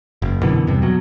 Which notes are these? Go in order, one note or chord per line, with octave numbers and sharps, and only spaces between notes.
F#1
F#2 B2 D3 E3
E2 G2 C3
B2 F#3